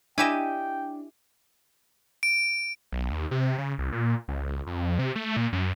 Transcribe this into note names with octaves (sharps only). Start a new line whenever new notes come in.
D4 E4 G4 D#5 G5 G#5 D6 E7
D7
B1
D#2
C3
C#3
C2
A#2
C#2
F2
C3
A3
A#2
F#2